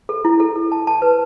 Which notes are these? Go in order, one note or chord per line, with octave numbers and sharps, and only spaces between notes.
A4
E4
A4
A4
A5
A5
B4